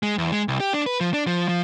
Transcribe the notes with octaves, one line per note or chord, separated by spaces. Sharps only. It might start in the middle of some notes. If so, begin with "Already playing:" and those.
G#3
E2
G#3
C2
G4
D4
B4
F3
D4
F3
F3